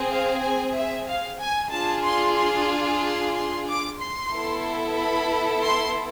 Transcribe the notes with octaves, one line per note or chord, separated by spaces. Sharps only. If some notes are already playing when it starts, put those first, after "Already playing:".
Already playing: C4 G#4
F5
G#5
E5
F5
G#5
D4 F4 G#4 A5
C6
C6
C6
C6
D6
C6
B3 E4 A4
B5
C6